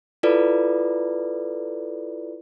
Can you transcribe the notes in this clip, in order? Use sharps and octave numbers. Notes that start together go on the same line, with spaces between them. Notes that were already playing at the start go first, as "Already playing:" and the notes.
E4 F4 A4 B4 D5